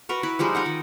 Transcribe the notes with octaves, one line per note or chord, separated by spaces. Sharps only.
F#4 A#4 B4
E4 B4
F3 G3 G#3 D#4
D#4 A#4 F#5
D#3